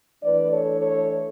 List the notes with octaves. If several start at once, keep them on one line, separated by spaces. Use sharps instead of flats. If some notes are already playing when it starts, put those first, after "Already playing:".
E3 A3 D4 B4 D5
A4 C#5
A4 C#5